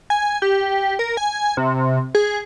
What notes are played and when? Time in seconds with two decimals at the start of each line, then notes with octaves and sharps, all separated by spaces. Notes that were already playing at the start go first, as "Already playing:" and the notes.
0.10 G#5
0.42 G4
0.99 A#4
1.17 G#5
1.57 C3
2.15 G#4